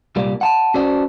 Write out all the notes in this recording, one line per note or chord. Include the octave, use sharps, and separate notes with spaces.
C2 A#2 G3 A#3 D5
F#5 A5
C#4 F#4 A4 C5 D5